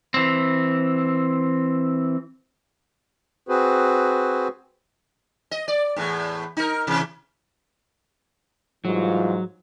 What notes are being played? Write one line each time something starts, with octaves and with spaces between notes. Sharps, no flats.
E3 C4
C4 F#4 G#4 B4 C5
D#5
D5
E2 A2
D#4 A#4
C3 E3
G#2 E3 F#3 G3 F4